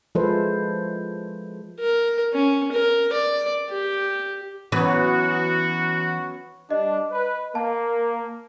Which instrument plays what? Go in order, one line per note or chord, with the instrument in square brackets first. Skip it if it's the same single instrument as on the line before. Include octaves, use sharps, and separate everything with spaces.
[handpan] F3 G#3 E4 A4 B4 C5
[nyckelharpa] A#4
C#4
A#4
D5
G4
[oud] E3 B4 [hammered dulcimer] F#3 B3 C#4 [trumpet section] F#4
[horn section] G3 D4 [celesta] D#5
[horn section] B4
[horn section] A#3 [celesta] A5